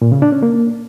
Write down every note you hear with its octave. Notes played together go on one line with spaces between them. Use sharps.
A#2
C#3
D4
C#4
A#3